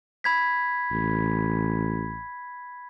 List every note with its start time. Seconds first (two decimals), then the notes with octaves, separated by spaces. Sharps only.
0.24 B5 G#6 B6
0.92 A1